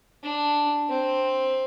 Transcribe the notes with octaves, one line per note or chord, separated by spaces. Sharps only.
D4
C4